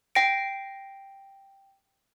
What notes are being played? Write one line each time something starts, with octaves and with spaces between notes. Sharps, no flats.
G5 A#6 D7